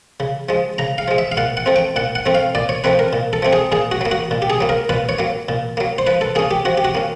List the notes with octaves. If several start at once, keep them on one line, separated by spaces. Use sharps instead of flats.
C#3
F3 G#3
C#3 A#5
F5
F3 G#3
E5
F5
A#2 F#5
F#5
F3 A3 C4
G5
A#2 F#5
F#5
F3 A3 C4
F5
A#2 D5
C#5
F3 A3 C4 B4
A#4
A#2
A4
F3 A3 C4
G#4
A#2 G#4
F#4
F#3 A#3
F#4
A#2
G4
G#4
F#3 A#3
A#4
A#2 B4
C#5
F#3 A#3
A#2
F#3 A#3
C5
F3 B4
A4
A#3 C#4 G#4
G4
F3 F#4
G4
F#4
A#3 C#4